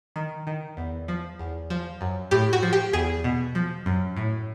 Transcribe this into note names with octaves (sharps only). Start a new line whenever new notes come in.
D#3
D#3
E2
F3
E2
F3
F#2
A2 G4
F#4
F3
G4
E2 G#4
B2
F3
F#2
A2